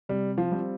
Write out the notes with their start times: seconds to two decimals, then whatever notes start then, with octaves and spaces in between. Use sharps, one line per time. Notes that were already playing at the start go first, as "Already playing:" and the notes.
0.09 C3 G3
0.38 F3
0.51 G3 C4 F4